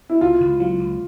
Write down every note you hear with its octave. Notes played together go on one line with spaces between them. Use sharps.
E4
C#2 F4
C#2
F#3 F4
C#2